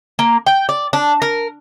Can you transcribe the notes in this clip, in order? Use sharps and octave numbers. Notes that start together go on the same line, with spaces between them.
A#3
G5
D5
D4
A#4